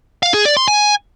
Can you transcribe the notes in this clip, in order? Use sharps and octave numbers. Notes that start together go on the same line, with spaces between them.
F5
G#4
D5
C6
G#5